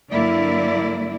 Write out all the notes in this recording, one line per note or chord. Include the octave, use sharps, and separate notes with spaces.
G2 D3 F#3 A#3 E4 D5